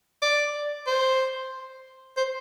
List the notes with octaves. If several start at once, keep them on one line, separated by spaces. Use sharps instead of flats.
D5
C5
C5